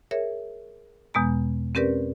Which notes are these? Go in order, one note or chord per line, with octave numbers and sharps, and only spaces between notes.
G#4 A#4 C#5 E5
E2 B2 G#3 B3 A#5
C4 C#4 G4 A#4 B4 D5